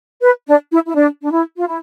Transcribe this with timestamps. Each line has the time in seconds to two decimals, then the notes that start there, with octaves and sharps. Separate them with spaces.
0.23 B4
0.47 D4
0.71 E4
0.87 E4
0.95 D4
1.22 D4
1.31 E4
1.57 F4
1.67 E4